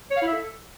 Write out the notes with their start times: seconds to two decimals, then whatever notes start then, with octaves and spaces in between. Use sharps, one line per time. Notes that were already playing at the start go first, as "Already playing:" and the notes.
0.11 C#5
0.16 F5
0.22 E4
0.27 E5
0.33 A4